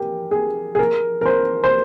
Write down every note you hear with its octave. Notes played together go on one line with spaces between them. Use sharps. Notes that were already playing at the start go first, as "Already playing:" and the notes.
Already playing: G4 A#4
G#4
G#4
A#4
A#4
C5
C5